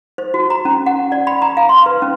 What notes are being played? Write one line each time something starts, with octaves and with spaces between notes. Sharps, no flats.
C5
F#4
A#5
C#4
F#5
D5
B5
A#5
F5
C6
B4
C#4